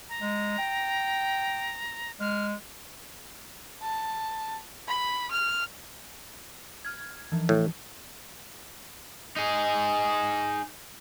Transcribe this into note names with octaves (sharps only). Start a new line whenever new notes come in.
A#5
G#3
G5
G#3 F6
A5
B5
F6
F6 G#6
E3 F3
A2 E3
D#4 G#4